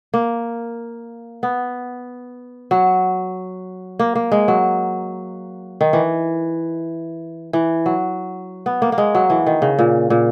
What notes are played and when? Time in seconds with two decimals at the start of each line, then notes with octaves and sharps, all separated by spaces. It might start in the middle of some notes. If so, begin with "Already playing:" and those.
0.14 A#3
1.43 B3
2.71 F#3
3.99 A#3
4.15 A#3
4.32 G#3
4.48 F#3
5.81 D#3
5.93 E3
7.53 E3
7.86 F#3
8.66 B3
8.82 A#3
8.92 A#3
8.98 G#3
9.15 F#3
9.30 E3
9.46 D#3
9.62 C#3
9.79 A#2
10.10 A#2